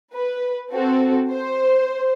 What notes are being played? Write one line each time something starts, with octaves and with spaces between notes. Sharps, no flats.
B4
C4 F#4 A4
C5